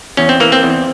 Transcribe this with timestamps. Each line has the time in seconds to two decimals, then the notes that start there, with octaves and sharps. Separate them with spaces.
0.17 E2 C#4
0.29 C4
0.40 E3 A#3
0.52 C4
0.63 E2